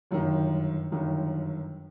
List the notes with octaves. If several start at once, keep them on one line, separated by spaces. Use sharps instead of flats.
G1 F#2 D#3
G1 F#2 D#3